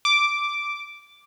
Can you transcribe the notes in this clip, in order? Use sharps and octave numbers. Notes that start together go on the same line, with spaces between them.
D6